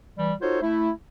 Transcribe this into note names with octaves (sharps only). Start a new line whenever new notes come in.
E3 G3
D#4 F4 F#4 A4 C5 C#5
A3 E4